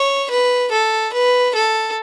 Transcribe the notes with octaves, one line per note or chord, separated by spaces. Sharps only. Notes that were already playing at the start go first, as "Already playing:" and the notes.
Already playing: C#5
B4
A4
B4
A4